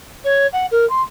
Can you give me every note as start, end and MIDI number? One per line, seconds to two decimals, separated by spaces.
0.24 0.47 73
0.52 0.66 78
0.71 0.88 70
0.89 1.01 84